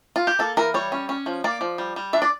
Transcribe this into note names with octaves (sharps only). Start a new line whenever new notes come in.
F4
G4
A#3 A4
E3 A#4
G3 C#5
C#4
C#4
F3
A#3 D5
F3
G3
G3
D4 E5
D5